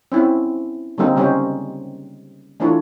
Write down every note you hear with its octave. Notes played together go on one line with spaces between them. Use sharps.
C4 C#4 E4
D3 G3 G#3 A#3 C4 D#4
C#3 G3 C#4 D#4 G4 C5
E3 A3 D4 E4 F4 C#5